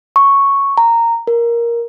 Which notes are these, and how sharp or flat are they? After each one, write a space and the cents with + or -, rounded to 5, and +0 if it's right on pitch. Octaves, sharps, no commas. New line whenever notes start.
C#6 -5
A#5 -10
A#4 +10